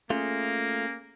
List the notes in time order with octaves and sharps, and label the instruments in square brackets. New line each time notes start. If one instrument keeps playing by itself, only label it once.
[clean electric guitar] A3 F4 [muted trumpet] A#3 [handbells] C#4 G#4 C#7